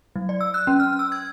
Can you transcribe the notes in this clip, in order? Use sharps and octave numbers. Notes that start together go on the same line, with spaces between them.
F#3
D5
E6
F#6
C#4
F6
E6
G#6